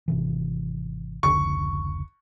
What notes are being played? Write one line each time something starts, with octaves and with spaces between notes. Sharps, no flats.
G#1 C3 E3
F1 C#2 D3 C#6